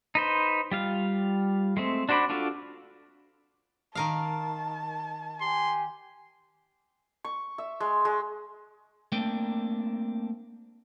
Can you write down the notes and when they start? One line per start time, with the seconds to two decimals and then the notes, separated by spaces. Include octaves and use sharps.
0.15 D#4 B4 C5
0.71 G3 F4 F5
1.77 G#3 A3 C4
2.09 D4 F#4 C5 D5 B5
2.30 D4 F4 F#4 A4
3.95 D#3 A#4 F5 A5
5.41 G4 G#5 C6
7.25 C#6
7.58 E5
7.80 G#3
8.05 G#3
9.12 A3 A#3 C4 D4 A#4 G5